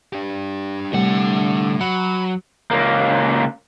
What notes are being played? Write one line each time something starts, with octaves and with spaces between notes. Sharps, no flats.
D4 G4
C2 A2 D3 F#5
F#3 F#5 B5
C#2 A#3